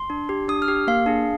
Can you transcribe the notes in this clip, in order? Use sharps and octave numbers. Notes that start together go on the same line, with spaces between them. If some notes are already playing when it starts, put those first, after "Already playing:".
Already playing: C6
D4
G4
D4 D#6
F6
G4
A#3 F5
D4 G#4